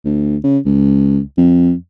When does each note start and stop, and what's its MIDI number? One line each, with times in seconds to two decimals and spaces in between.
0.05 0.37 38
0.44 0.58 49
0.65 1.20 37
1.38 1.73 41